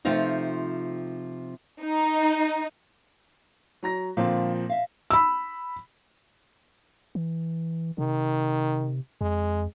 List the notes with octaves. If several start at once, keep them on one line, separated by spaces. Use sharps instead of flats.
C3 F3 A3 C4 D#4 F4
D#4
F#3 A#5 A#6
A#2 D3 F3 C4 F5
E5 F5
B5 E6
E3
C3 D#3
F2 G#3